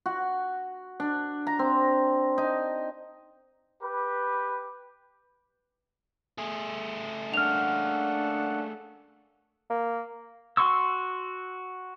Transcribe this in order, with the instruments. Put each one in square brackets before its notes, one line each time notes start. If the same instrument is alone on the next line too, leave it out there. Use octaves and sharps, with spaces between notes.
[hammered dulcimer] F#4
D4
A#5
C4
D#4
[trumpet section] G4 B4
[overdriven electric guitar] A3 G#4
[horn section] A#3 C#4 F#5 [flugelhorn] D4 [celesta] F6 F7
[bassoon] A#3
[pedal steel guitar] F#4 C6 C#6 E6